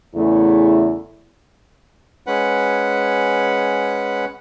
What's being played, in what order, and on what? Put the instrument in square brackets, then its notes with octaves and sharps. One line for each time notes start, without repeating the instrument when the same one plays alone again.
[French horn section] E2 C#3 A3 E4
[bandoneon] G#3 C#4 B4 F#5